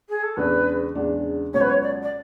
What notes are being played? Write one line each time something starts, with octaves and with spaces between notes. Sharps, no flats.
G#4
A4
E2 C#3 G#3 D4 B4
E2 C#3 G#3 D4
C#2 B2 F#3 C#4 C#5
B4
C#5
D5
D5